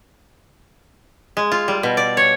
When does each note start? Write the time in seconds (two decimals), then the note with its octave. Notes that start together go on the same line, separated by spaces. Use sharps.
1.37 G#3
1.52 F4
1.68 G3
1.83 B2
1.97 D5
2.17 C#5